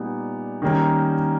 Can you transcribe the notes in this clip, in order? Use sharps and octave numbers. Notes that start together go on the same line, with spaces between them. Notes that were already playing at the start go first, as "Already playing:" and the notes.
Already playing: A#2 G3 B3 D#4
D#3 G3 A#3 C#4